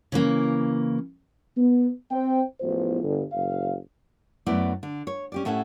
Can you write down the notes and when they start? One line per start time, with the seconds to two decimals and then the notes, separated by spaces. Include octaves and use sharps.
0.12 C#3 E3 A#3
1.57 B3
2.11 C4 C5 G5
2.60 A1 E2 F3 B3 E4 C5
3.02 G1
3.32 F#1 F5
4.46 F#2 A3 B3 E4 D5
4.83 D3
5.07 C#5
5.32 C#4 G4 D5
5.45 A2 C#4 A4 E5 F#5